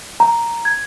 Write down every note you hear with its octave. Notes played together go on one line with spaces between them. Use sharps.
A#5
G#6